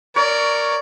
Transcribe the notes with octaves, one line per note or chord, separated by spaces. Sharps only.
A#4 C#5 D5